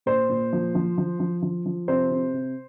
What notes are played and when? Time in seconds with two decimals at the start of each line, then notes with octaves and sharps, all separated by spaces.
0.06 A#2 C5
0.29 A#2
0.53 F3
0.75 F3
0.98 F3
1.20 F3
1.42 F3
1.66 F3
1.88 C3 C5
2.11 C3
2.34 C3